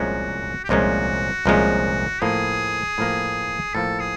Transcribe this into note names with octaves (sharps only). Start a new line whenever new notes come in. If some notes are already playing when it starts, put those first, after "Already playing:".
Already playing: C2 A#2 F3 G#3 C#4 F#4
G4
C2 A#2 F3 G#3 C#4 F#4
C2 A#2 F3 G#3 C#4
A2 F3 A#3 G#4
A2 F3 A#3
A2 F3 A#3 A4
G#4